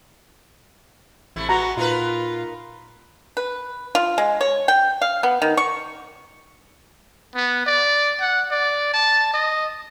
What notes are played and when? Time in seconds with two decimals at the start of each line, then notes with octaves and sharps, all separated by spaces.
1.36 A1 C3 A3 E4
1.49 G#3 B3 F#4 A#5
1.77 A#2 D#4 F4 A#4 B4
3.37 B4
3.95 F4
4.18 G#3
4.41 C#5
4.68 G5
5.02 F5
5.23 B3
5.42 D#3
5.57 C#6
7.35 B3
7.66 D5
8.21 F#5
8.51 D5
8.94 A5
9.34 D#5